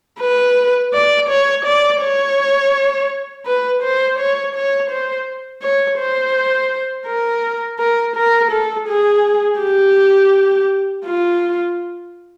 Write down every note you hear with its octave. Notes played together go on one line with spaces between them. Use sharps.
B4
D5
C#5
D5
C#5
B4
C5
C#5
C#5
C5
C#5
C5
A#4
A#4
A#4
A4
G#4
G4
F4